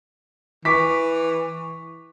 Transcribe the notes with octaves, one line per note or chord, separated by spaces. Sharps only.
E3 C#6 D6 B6